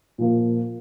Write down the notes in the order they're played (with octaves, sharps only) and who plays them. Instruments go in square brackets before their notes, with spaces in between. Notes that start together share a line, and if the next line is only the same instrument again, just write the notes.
[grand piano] A#2 F3 A#3